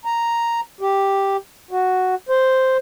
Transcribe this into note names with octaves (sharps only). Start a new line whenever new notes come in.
A#5
G4
F#4
C5